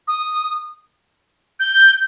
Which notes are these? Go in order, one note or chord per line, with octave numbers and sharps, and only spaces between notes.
D#6
G6